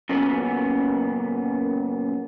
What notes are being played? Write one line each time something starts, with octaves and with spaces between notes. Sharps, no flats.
F#2 A#2 C#3 B3 C#4